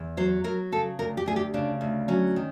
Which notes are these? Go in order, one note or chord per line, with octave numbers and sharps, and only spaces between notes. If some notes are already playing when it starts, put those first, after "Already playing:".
Already playing: E2
F#3 C5
F#3 A#4
C#3 A4
D2 A#4
G4
D2 G#4
G4
C#3 D4
D2
F#3 C#4
D#3